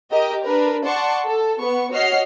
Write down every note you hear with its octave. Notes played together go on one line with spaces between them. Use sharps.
G4 A#4 D#5
D4 A#4 B4
D5 F#5 A5 C6 C#6
A4
B3 C#6
F#4 C#5 D#5 F6 C7